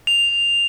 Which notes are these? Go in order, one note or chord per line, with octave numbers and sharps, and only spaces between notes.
F7